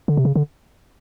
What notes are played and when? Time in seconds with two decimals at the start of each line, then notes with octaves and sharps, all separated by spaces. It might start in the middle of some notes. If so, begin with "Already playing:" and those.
0.08 D3
0.17 C3
0.25 C#3
0.36 D3